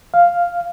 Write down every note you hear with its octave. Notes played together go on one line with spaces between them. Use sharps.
F5